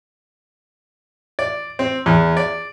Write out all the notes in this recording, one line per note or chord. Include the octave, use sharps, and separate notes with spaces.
D5
C4
E2
D5